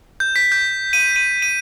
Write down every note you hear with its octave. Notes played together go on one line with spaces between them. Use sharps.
G6
B6
G6
D#7
D#7
D#7